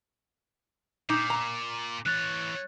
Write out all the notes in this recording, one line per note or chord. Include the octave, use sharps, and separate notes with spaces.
A#2 D#4 D6
A#5
E3 C#5 F#6 A6